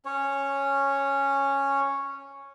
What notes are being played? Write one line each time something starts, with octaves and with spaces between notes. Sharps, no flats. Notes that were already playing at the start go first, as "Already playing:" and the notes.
C#4 C#5